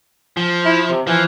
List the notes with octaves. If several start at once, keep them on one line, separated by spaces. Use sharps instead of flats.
F3
E4
C3
E3 F3